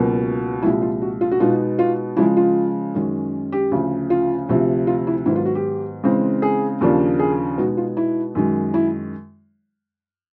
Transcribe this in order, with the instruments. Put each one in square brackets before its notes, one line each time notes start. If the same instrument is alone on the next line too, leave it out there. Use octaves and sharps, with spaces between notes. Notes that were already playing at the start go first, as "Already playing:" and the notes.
Already playing: [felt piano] C#2 B2 F#3 A#3
C2 A#2 F3 G#3 E4
F4
F#4
F4
F#4
B2 G#3 B3 D#4 F4
F4
C#3 F3 G#3 E4
F4
F#2 D#3 G#3 C#4
G4
D2 C#3 F3
F4
D2 C3 F3
F4
E4
G#2 D#3 F#3 B3 E4
F4
F#4
G4
C#3 E3 G#3 C4
G#4
D#2 C#3 F3 A#3 D4
G#4
B2 G#3 B3 D#4 F#4
F4
E4
F#2 D#3 G#3
E4